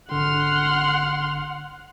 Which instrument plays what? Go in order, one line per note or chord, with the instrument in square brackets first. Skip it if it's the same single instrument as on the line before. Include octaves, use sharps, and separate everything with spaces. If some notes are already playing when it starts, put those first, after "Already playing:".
[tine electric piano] G#1 D3 [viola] F#5 [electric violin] C6 F6